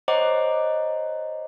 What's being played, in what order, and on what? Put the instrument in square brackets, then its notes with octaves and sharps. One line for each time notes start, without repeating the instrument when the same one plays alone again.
[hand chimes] C5 C#5 D#5 F#5 A#5 D6